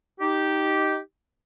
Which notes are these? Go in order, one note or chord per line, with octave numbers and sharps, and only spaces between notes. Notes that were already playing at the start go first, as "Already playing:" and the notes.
D#4 G4